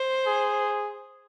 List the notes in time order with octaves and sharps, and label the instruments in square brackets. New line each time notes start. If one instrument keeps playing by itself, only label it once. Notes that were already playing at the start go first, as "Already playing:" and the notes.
Already playing: [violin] C5
[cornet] G#4